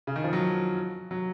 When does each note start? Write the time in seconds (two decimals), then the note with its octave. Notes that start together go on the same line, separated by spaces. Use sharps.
0.07 C#3
0.16 D#3
0.24 F3
0.33 F#3
1.11 F#3